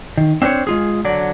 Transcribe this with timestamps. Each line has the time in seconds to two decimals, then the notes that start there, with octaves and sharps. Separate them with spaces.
0.17 D#3
0.42 C4 D4 G4 C5 C#5
0.67 G#3 F4 G#4
1.05 D3 F#3 D5